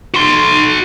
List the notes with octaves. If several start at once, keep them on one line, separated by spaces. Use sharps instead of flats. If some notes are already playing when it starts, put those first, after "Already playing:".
F#4 C6